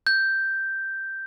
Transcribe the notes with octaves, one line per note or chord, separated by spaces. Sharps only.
G6